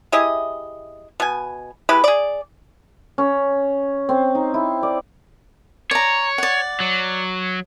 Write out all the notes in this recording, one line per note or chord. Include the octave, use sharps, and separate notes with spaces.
E4 G4 G#4 D#5
B2 G#5
G#3 E4 G4 B4
G#4 D5
C#4
C4
D#4
E4
D5
C#5 D5 A#5
D5 F#5
F#3